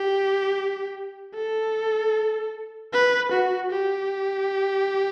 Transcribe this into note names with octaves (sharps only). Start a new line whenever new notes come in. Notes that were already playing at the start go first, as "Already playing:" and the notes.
Already playing: G4
A4
B4
F#4
G4